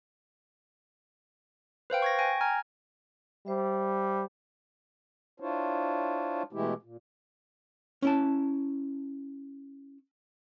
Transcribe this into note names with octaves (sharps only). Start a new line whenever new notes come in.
B4 C5 F5 G5
C#6 G#6 A#6
G5 G#5 A#6
G#5 A#5 F6 G#6
G3 C5 E5
D4 E4 F4 C5 C#5
B2 E3 G#3 A3 E4 G4
A#2
C#4 E4 A5